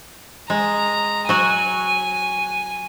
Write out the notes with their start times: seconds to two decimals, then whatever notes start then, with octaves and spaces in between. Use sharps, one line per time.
0.50 G#3 A#5
1.29 F#3 F#4 G#5